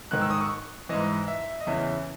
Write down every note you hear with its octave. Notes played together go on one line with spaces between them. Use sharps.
G#2 D#3 F#6
E6
D#6
C#6
G#2 E3 D#5
E5
D#5
E2 C#3 E3 E5